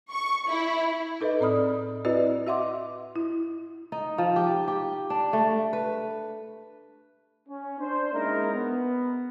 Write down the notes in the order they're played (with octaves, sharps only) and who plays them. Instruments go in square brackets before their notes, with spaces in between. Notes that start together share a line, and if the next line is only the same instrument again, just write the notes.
[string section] C#6
E4
[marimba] D#4 A4 B4 D#5
A2 C4 D5 B5 D#6 F6
C4 E4 F#4 B4 D5 D#5
F#4 D#5 E5 F#5 C6 D6
E4
[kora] D#4
F3
G4
G4
D4
A3
B4
[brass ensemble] C#4
D4 C5
G#3 A#3 C#4 D#4 E4 A#4
B3